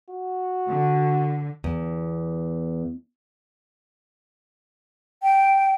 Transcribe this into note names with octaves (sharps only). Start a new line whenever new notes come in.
F#4
D3
E2
G5